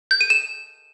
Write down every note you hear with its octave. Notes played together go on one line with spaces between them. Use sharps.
G6
D#7
E7